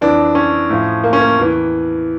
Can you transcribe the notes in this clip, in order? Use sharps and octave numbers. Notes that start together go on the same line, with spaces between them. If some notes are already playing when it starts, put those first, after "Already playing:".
F2 E3 D4
C#4
A2 F3
A#3
C#4
A#3
E2 E3